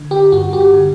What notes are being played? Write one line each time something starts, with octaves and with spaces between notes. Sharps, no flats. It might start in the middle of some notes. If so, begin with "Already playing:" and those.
Already playing: D3
G4
G2 F#4
G4
D3